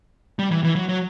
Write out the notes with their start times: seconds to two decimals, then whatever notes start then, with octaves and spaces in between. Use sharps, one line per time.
0.39 G3
0.51 E3
0.64 E3
0.76 F#3
0.89 F#3